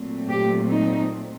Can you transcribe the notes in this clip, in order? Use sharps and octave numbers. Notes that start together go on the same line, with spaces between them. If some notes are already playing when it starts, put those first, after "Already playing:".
Already playing: A#2 F#3 A3 C4
G4
D#4